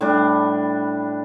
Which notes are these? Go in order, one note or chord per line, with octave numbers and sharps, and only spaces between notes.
A2 G3 D4